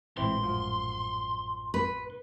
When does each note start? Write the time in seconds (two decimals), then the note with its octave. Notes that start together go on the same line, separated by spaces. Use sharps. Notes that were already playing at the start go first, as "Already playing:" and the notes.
0.17 A1 A#2 E3 G#3 C4 E4 C6
0.43 F#2 F3
1.74 B4